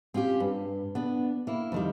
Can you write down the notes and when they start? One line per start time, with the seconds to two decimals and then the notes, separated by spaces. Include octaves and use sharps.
0.14 C4 C#4 F4 G4
0.40 G2
0.95 B3 D4
1.47 A#3 E4
1.72 F2 D#3 G3